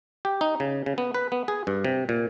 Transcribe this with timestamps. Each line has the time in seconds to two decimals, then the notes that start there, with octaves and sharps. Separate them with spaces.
0.25 G4
0.41 D#4
0.60 C#3
0.86 C#3
0.98 B3
1.14 B4
1.32 B3
1.48 G#4
1.67 G2
1.85 C3
2.09 A#2